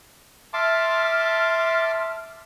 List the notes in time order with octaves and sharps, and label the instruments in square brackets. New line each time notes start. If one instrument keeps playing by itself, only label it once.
[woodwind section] E5 F6 [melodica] A5 C6 D6